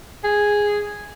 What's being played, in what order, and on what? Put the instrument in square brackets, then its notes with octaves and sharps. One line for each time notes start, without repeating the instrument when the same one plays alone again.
[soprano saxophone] G#4